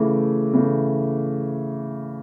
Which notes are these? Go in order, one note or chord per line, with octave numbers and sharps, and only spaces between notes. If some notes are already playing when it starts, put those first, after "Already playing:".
Already playing: C#3 E3 A3
C#3 E3 A3